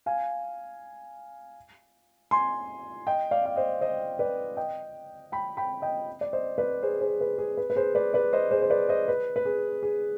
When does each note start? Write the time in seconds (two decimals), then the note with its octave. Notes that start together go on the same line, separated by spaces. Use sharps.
0.06 F5 G#5
2.31 G#5 C6
3.07 D#5 G5
3.31 D5 F5
3.45 F5
3.56 C5 D#5
3.81 C5 D#5
4.19 B4 D5
4.57 D#5 G5
5.32 G5 B5
5.57 G5 B5
5.82 D#5 G5
6.21 D5
6.33 C5 D#5
6.58 B4 D5
6.83 G#4 C5
7.01 G#4 C5
7.21 B4
7.38 G#4
7.57 B4
7.70 B4
7.76 G#4 C5
7.95 B4 D5
8.14 B4 D5
8.33 C5 D#5
8.51 G#4 C5
8.62 C5
8.70 B4 D5
8.89 C5 D#5
9.08 B4
9.36 B4
9.45 G#4
9.83 G#4